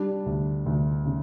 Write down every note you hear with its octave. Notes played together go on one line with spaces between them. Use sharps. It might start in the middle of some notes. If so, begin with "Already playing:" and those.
Already playing: G3 D4
D2
D2
C#3